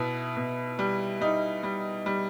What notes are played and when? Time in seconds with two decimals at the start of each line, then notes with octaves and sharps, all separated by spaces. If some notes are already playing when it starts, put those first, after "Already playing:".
Already playing: B2 B3 E4
0.37 B2
0.79 G3
1.21 G3 D#4
1.63 G3
2.06 G3